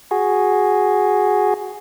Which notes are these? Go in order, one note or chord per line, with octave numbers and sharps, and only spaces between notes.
F#4 G#4